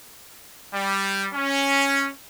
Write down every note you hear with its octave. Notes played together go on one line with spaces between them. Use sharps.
G3
C#4